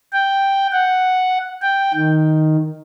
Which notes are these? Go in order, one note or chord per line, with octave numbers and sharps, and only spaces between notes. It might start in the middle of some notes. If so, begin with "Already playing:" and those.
G5
F#5
G5
D#3